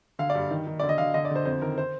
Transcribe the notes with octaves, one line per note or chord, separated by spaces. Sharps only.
D3 F5
D5
G2
D#3
D#3
D3 D5
D#5
D3 F5
D3 D#5
D5
D3 C5
F2 C5
D#3 A#4
C5